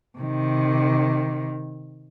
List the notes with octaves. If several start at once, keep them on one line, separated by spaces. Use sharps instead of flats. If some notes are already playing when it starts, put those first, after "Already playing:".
C3 D#3